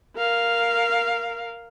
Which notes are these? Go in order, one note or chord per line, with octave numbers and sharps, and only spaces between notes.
A#4 F5